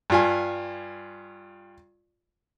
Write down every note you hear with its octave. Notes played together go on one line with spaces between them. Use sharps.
G2 F4 G#5